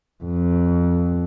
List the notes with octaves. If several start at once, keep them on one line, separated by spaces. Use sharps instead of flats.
F2